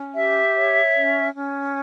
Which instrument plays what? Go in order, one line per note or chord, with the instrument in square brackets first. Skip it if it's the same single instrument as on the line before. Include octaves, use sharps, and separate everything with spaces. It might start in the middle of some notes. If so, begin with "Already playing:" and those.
Already playing: [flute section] C#4
G4 E5
C#5
C#4
C#4